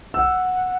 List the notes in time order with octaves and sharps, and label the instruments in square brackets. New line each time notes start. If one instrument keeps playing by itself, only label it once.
[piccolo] F#5 [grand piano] E6